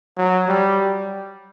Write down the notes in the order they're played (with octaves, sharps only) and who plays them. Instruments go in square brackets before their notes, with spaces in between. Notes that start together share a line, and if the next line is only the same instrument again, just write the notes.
[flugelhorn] F#3
G3